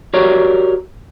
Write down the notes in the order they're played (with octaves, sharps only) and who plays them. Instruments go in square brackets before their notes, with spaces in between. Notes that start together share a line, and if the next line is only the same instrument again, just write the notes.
[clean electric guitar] F#4 G4 A#4 C#5 D5